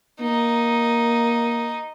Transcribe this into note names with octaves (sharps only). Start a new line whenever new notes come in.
A#3 D#4